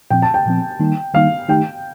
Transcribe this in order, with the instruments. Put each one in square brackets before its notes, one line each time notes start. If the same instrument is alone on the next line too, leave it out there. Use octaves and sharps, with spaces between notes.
[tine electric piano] A#2 F3 C4 [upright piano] G5
[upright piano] A5
G5
[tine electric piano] A#2 F3 C4
D#3 G3 A#3 D#4
[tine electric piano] D#3 G3 A#3 D#4 [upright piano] F5
[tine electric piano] D#3 A3 D#4 G4 [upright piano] G5